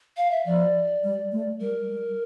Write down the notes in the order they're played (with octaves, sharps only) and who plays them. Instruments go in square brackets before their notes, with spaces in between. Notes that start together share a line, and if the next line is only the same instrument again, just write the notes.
[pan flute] F5
E5
[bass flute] F3 [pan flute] D5
[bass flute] G3
A3
[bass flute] G3 [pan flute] A#4
[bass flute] G3